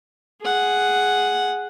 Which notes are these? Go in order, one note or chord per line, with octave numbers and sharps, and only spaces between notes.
G#4 F#5